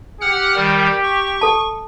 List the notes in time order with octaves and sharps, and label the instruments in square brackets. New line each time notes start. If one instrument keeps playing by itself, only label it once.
[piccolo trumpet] G4 [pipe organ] F#5 F6 F#6
[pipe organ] D#3 G3
C#6
[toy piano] A4 A5